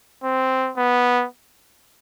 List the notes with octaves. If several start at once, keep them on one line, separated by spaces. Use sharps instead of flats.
C4
B3